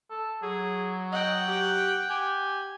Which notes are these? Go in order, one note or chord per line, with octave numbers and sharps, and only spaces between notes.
A4
F#3 G#4
D#5 F#5 G5
G4
G4 G#5